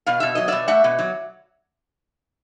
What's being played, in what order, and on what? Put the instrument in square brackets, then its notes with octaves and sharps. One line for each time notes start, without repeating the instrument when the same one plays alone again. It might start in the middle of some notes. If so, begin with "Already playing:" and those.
[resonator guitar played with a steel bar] B2 F5
B2 E5
F#3 D#5
B2 D5 E5
A3 E5 F#5
B2
F#3